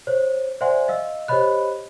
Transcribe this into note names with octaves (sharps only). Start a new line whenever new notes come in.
C5 C#5
C5 D5 E5 F#5 G#5 C6
D#5 F5 E6
G4 C5 C#5 D#5 B5 F#6